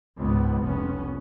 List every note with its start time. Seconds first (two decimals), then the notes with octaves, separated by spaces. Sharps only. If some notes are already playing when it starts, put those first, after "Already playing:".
0.17 C#2 G#2 B3
0.61 F1 C2 B3 C#4